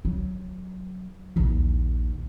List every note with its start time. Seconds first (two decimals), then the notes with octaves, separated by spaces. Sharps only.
0.05 F#3
1.36 A#1 D#2